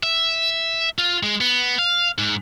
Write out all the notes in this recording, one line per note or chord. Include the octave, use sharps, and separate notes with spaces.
E5
F4
G#3
B3
F5
G#2